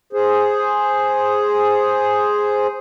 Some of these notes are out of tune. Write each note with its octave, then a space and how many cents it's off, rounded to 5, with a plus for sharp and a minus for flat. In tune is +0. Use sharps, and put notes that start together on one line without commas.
G#4 +0 C5 +0